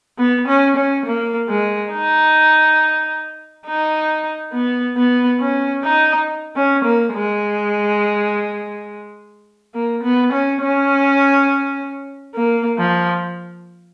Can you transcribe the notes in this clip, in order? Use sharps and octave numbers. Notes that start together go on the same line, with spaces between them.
B3
C#4
C#4
A#3
G#3
D#4
D#4
B3
B3
C#4
D#4
C#4
A#3
G#3
A#3
B3
C#4
C#4
A#3
F3